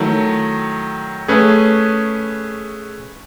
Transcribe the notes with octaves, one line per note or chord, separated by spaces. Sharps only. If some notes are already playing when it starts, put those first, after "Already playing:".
Already playing: D#3 F#3 A3 E4
A3 C#4 G#4 B4